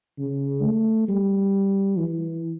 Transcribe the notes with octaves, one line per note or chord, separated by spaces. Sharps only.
C#3
A3
G3
E3